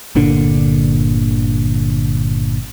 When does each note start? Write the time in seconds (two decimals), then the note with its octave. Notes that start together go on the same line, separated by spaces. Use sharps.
0.15 G1 A#2 D3 D4